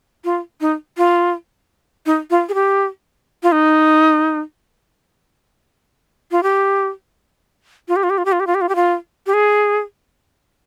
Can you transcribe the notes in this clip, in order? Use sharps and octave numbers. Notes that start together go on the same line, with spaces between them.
F4
D#4
F4
D#4
F4
G#4
G4
F4
D#4
F4
G4
F4
G4
F4
G4
F4
G4
F4
G4
F4
G4
F4
G4
F4
G4
G#4